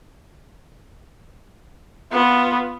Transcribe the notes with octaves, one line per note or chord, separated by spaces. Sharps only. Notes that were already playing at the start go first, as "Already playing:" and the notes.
B3 F4